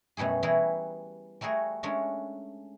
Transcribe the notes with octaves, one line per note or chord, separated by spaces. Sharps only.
F#2 B2 G3 A3 G#4
E3 G3 E4 F#4 G#4 A#4
G3 A3 F#4 G#4 A#4
G#3 A3 C#4 D4 A#4